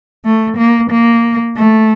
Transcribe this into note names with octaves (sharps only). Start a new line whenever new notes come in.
A3
A#3
A#3
A3